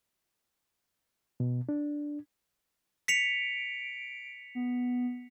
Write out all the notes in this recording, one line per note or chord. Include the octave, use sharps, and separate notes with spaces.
B2
D4
B6 C#7 D7 F7
B3